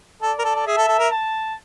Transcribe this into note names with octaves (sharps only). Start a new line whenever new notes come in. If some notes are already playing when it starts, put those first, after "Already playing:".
A4 D5
A#4
A4
A4
G#4 E5
A4
A4
A#4
A5